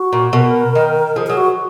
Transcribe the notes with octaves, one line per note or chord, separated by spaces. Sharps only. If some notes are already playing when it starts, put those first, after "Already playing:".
Already playing: F#4
A#2
B2 A#4
D#3
F3 G#4
F#3 G#4
F#4